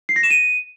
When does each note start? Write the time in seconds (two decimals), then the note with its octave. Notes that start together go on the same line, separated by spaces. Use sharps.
0.09 C7
0.16 A#6
0.23 E7
0.30 D#7